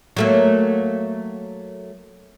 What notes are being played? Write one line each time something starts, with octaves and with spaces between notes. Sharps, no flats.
F#3 A3 A#3